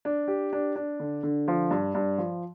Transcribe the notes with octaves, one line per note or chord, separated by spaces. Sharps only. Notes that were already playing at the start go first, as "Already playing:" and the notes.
D4
G4
D4
D4
D3
D3
F3
G2
G2
F3